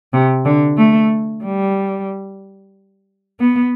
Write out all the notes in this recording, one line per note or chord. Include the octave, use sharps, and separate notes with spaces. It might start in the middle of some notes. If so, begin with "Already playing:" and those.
C3
D3
A3
G3
B3